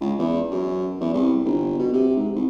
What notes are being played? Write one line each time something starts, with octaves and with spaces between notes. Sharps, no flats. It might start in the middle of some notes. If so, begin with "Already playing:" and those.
C#2
E2
F#2
E2
C2
G1
B2
C3
G#2
C2